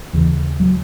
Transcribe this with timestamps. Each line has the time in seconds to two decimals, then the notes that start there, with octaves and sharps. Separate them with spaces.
0.13 D#2 C#3 E3
0.60 F#3